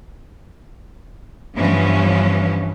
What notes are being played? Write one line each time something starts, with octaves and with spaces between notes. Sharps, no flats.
G2 E3 F3 B3 C#4